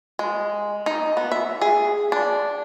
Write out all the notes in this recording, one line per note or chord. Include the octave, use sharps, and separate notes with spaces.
G#3
D#4
B3
E5
G#4
D4